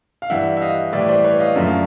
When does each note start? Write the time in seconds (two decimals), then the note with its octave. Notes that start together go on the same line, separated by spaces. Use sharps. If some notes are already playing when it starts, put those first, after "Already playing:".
0.22 F5
0.30 G2 E3 G3 E5 F#5
0.57 E5
0.61 D#5 F5
0.93 A2 E3 G3 D5 E5
1.09 C5 D5
1.24 B4 C#5
1.40 D#5 F5
1.56 F#2 D3 F3 A3 E5
1.66 F5